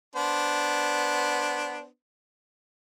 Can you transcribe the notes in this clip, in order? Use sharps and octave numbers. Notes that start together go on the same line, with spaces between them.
B3 D4 C5